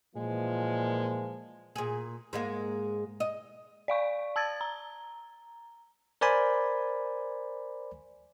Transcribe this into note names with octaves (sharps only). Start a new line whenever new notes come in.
A#2 E3 F3 G#3 A#3
A#2 G#4
G#2 G#3 A#3
D#5
D5 F5 C#6
A5 E6 G#6 A6
A#5
A#4 C5 D5 G#5 B5